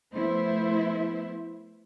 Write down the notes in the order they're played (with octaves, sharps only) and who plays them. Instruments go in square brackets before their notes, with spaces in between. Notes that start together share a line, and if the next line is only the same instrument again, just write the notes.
[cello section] F3 A3 B3 E4 C5 E5